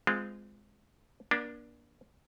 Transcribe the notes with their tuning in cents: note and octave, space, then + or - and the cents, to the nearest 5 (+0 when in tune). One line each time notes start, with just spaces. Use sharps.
G#3 -5 C4 -30 F4 +0
A#3 +40 D4 +0